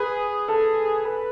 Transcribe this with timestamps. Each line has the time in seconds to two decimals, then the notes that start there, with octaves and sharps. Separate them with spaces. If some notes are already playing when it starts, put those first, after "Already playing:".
Already playing: G#4 B4
0.48 A4
1.05 B4